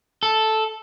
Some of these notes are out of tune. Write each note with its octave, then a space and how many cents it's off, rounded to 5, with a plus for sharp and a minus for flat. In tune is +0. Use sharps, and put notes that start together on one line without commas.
A4 -5